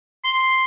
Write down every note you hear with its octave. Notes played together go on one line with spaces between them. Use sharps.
C6